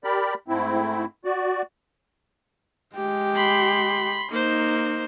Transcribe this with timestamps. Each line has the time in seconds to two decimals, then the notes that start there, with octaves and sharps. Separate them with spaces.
0.04 G4 A#4 D5 B5
0.48 G#2 A3 C4 E4
1.25 F#4 D5
2.96 G#3 G4
3.35 B5 C6
4.31 A#3 D#4 C5